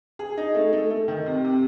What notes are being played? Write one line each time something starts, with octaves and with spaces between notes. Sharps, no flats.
G#4
D#4
A3
A3
A3
D#3
C3
C3